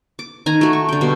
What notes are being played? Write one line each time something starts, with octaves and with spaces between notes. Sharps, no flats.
D6
D#3 G#5 A#5
A3 F#4
C#6
D3 G5
B2 G3